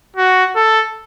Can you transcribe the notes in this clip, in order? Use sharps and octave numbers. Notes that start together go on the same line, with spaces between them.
F#4
A4